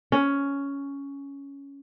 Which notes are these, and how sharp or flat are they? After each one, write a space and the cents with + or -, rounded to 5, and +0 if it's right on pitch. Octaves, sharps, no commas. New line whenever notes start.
C#4 +10